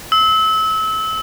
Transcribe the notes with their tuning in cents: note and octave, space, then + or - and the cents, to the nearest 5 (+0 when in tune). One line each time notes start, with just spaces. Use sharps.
E6 -30